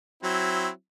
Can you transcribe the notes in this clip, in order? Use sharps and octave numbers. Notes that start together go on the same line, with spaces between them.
F#3 C4 E4